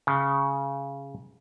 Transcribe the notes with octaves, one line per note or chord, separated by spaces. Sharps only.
C#3